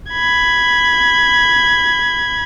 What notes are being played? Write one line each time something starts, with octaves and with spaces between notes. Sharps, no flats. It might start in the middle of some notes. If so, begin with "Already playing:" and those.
B5 G#6